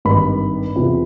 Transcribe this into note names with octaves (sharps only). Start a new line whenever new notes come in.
G#1 G2 D#3 B5
E2 C3 F3